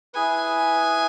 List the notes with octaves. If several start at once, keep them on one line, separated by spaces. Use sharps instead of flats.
E4 G#4 B4 G#5